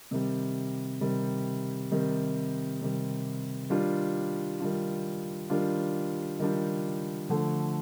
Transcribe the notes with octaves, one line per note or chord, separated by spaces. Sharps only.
C3 D#3 G3
C3 D#3 G3
C3 D#3 G3
C3 D#3 G3
D#3 G3 D4 F4
D#3 G3 D4 F4
D#3 G3 D4 F4
D#3 G3 D4 F4
D3 F3 A3